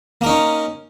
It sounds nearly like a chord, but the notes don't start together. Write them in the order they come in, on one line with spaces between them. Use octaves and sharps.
A#3 A#4 D#4 C#4